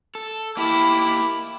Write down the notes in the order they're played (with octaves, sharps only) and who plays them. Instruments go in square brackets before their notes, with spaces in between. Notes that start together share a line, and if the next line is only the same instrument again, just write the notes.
[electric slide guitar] A4
[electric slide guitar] A#3 G4 [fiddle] E4